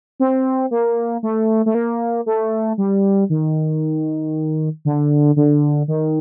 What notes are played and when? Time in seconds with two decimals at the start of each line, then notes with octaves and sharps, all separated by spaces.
0.20 C4
0.71 A#3
1.23 A3
1.66 A3
1.75 A#3
2.26 A3
2.78 G3
3.30 D#3
4.85 D3
5.36 D3
5.88 D#3